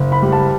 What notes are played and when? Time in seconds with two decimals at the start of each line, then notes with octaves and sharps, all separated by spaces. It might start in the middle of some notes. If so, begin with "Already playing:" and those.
Already playing: F#1
0.12 B5
0.22 G3
0.32 A5